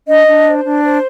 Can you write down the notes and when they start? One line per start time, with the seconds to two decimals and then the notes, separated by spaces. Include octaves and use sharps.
0.08 D4 D#5
0.27 D4
0.46 C5
0.65 D4
0.84 C5